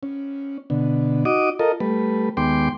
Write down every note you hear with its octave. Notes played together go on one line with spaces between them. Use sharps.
C#4
B2 D3
D#4 F#4 D#5 D6 D#6
F4 A4 A#4 D#5
G3 A3 B4
D#2 G#3 B3 G5 C6 D6